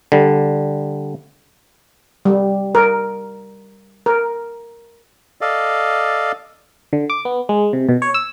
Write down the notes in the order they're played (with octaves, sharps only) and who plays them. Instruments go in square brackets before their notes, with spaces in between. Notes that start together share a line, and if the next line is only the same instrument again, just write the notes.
[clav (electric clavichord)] D3 G3
[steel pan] G3
A#4
A#4
[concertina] A4 D5 D#5 F5
[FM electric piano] D3
D6
B3
G#3
C3
B2
C#5
E6